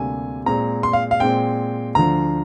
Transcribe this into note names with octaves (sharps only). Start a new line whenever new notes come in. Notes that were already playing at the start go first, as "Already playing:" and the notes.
Already playing: D2 C3 G3 A#3 G#5
A#2 G#3 C4 A#5
C6
F5
F5
A#2 G#3 C4 G5
D2 D3 F3 A#5